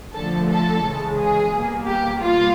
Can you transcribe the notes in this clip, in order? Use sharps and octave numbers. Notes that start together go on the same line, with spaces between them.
D3 F3 A3 A4
A4
C#3 E3 G#3
G#4
B2 G3 A#3
G4
B2 G3 A#3 F4